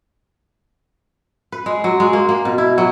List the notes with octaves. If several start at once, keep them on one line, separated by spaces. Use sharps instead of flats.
B4
G#3
F#3
G#3
A#3
A#3
B2
E4
F#3